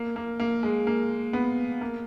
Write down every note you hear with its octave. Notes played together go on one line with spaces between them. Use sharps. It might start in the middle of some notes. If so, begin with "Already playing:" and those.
Already playing: A#3
A#3
A#3
G#3
A#3
B3
A#3